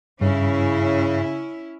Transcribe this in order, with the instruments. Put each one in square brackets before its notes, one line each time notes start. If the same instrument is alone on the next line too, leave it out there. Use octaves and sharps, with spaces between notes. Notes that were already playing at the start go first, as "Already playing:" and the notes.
[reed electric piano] G2 [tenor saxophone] C#3 [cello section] C#4 E4